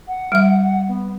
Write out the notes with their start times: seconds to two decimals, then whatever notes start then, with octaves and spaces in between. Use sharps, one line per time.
0.08 F#5
0.32 G3 E5
0.88 B3